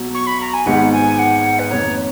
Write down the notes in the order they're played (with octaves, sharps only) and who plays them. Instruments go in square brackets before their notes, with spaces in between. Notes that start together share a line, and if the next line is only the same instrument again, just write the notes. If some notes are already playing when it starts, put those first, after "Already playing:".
Already playing: [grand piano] B1 B2 F#3
[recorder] C#6
B5
A#5
G#5
[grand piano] G#1 G#2 D#3 G#3 B3 [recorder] F#5
[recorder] G#5
F#5
B4
[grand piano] F2 D#3 A#3 D#4 [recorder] C#5